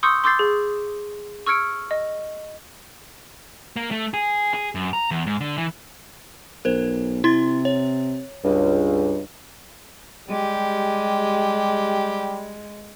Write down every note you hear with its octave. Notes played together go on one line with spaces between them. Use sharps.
C6 C#6 D#6 E6 G6 C#7
C6 D6 E6 G6 A6 C7
G#4
C#6 E6 F6 G#6 C#7 D7
D#5
A#3
A3
G#4
G#4
F#2
A#5
E2
G#2
D3
E3
B1 A#4 C5
C3 E4 C6 A6
C#5
C#2 G2
G3 G#3 G4